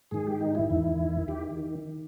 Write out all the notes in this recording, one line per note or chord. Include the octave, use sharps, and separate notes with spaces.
G#2 D#3 G#4
G4
D#4
E4
E2 D#3
D#3 G4